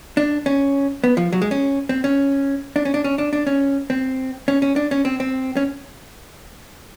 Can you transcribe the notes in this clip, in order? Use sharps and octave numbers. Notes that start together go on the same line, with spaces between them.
D4
C#4
B3
F3
F#3
G#3
C#4
C4
C#4
D4
C#4
D4
C#4
D4
D4
C#4
C4
C#4
C#4
D4
C#4
C4
C4
C#4